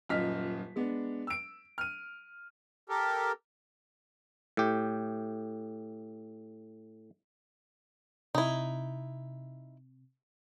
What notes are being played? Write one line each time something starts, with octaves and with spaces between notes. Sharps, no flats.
D#1 F#2 F4 D#5 F6 B6
G#3 B3 D4
E6 D7
F6 D#7
G4 A4 A#4
A2 G4
C3 D#4 E4